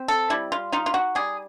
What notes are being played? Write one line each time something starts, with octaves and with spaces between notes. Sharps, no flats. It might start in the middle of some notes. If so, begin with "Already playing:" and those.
Already playing: C4
A4
G3 E4
F4
D#4 F4
F4
F#4
G3 G#4